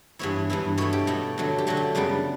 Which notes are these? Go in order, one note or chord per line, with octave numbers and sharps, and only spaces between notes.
G2 E3 B3 E4 C#5
G2 E3 B3 E4
B2 A3 E4 C#5
G4
B2 A3 E4
D3 F#3 A3
G4
D3 F#3 A3 F#4
G4
F#2 C#3 G3 B3 D4 B4